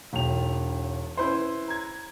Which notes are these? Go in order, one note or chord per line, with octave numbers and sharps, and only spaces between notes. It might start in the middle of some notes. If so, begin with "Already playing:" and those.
E1 B1 G5 F7
C#4 E4 B4 C5
A#5 G#6